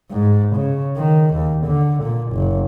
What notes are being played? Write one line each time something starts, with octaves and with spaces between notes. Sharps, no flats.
G#2
C#3
D#3
D#2
D3
A#2
F#1